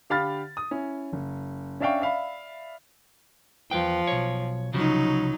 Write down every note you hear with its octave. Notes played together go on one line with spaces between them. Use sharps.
D3 G4 F5 B5 F6 A6
D#6
C#4 E4
F#1
C#4 D4 E5 F5 G5 C#6
D5 E5 F5 B5
E2 F3 B4 G5
B1 C#5
C2 C#3 F3 F#3 D#4